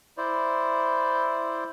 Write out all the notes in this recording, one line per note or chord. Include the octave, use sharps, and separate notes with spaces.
E4 C5 D5